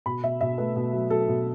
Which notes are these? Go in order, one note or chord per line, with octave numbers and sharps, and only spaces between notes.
B2 B5
B2 E5
B2 E5
A3 B4
B2
F#3
F#3 A4
B2